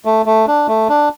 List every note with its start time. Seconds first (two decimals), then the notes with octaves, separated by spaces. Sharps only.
0.05 A3
0.26 A3
0.47 D4
0.68 A3
0.89 D4